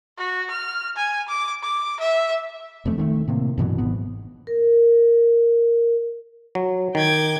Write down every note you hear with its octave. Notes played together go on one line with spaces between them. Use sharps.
F#4
F6
G#5
D6
D6
E5
E1 F2 A3
D#3 G#3 A3
A2 C3 A#3
G2 B2 E3 F#3
G#1 G#2 B3
A#4
F#3
D#3 G5 D6 G#6